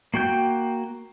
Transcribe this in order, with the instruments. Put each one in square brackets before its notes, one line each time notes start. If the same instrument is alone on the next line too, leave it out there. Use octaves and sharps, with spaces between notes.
[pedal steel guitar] A#3 F#4 G5 G6